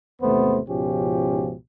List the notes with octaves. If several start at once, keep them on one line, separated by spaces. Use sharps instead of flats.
G#1 E2 C3 A3 B3 C5
C#2 G#2 B2 F3 C#4 G4